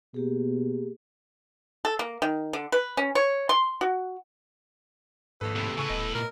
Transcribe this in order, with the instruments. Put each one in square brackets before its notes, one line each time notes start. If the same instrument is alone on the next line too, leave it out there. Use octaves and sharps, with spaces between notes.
[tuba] B2 [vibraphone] A#3 G4 G#4
[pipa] A4
A#3
D#3
D3
B4
C#4
C#5
C6
F#4
[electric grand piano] A#1 D#2 B4 [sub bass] G#2 [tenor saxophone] A4
[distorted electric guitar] A2 C3
[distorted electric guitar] A2 B4 [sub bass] C#3 [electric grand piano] G#5 C#6 E6
[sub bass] D#1 [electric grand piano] B3 D#5
[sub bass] A#2 [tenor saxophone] A#4